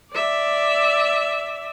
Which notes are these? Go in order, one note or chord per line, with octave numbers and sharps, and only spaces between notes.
D5 E5